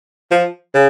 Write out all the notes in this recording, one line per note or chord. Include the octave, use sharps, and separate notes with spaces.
F3
C#3